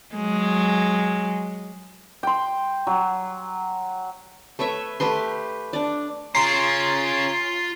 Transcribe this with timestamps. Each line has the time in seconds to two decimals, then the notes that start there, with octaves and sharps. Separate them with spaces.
0.15 F#3 G#3
2.23 G5 C6
2.87 F#3
4.59 A3 B4 C#5 E5
5.00 A3 G4 B4 C6
5.73 D4 D5
6.35 C#4 F4 G#4 A#5 C6 C7